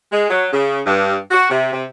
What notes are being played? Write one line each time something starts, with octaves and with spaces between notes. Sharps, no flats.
G#3
F#3
C#3
G2
F#4
C3
C3